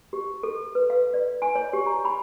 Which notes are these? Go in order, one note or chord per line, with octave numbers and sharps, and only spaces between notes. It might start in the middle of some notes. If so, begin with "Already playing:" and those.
G4
A4
B4
F5
D5
G#5
C#5
G4
A#5
B5